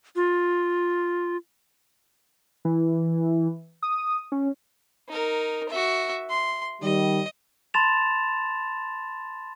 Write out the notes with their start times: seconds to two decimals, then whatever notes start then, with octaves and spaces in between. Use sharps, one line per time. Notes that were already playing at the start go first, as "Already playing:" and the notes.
0.16 F4
2.65 E3
3.82 D#6
4.32 C#4
5.09 D#4 A#4
5.69 F#4 E5
6.30 C6
6.82 D#3 G3 D#5
7.74 A5 B5 C6 A6 E7 F7